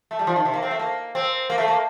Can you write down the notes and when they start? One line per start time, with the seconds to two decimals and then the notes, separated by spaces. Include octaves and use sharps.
0.11 A3
0.19 G3
0.27 F3
0.36 D#3
0.45 C3
0.54 A#3
0.63 C4
0.71 A3
0.79 A#3
1.15 C4
1.50 A#3
1.58 A3
1.68 A#3